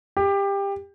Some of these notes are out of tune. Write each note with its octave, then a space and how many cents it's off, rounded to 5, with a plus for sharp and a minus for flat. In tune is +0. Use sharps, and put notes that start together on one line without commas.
G4 +20